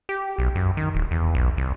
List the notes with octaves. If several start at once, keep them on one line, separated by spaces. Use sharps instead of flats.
G4
B1
F#2
D#3
D1
E2
B1
C2